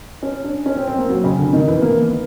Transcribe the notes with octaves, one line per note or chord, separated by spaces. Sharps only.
C#4
D4
C#4
C4
C4
A#3
F#3
C#3
D3
D#3
E3
A#3
B3